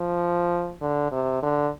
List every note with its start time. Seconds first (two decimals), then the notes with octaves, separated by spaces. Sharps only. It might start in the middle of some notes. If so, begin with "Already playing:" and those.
Already playing: F3
0.81 D3
1.12 C3
1.42 D3